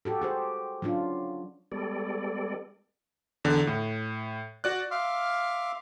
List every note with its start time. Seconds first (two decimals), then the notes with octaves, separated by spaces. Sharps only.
0.05 F#4 G4 A4
0.22 G4 G#4 C5
0.82 F#3 C#4 D4 F4
1.72 G3 G#3 B3 A4 D5
3.45 E2 D3
3.67 A2
4.64 F#4 D5 F#6
4.91 E5 F5 C6 D6 F6